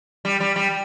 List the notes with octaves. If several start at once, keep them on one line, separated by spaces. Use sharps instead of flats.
G3
G3
G3